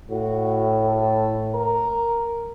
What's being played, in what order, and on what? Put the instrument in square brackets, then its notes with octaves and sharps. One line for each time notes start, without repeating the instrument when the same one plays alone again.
[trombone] A2 [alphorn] F#4
[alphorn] A4
A#4